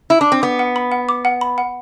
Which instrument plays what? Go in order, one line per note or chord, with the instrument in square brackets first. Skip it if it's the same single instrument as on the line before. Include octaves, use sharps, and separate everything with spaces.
[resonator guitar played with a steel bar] E4
D4
C4
[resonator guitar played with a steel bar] B3 [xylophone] D6
[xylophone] F#5
B5
F#5
D6
F#5
B5
F#5